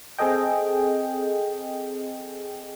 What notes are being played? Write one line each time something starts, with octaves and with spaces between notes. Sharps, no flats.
C4 G#4 A4 D#5 G5